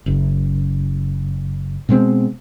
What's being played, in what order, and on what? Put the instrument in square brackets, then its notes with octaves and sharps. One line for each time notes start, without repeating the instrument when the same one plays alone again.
[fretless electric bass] F#1
B2 G#3 C4